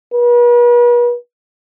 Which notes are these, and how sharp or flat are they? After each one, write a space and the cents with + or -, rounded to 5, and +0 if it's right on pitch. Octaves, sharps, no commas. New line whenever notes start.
B4 -40